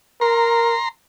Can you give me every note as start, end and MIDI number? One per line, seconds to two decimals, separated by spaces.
0.21 0.75 70
0.21 0.89 82
0.21 0.89 84